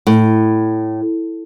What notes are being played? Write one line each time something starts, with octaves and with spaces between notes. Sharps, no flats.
A2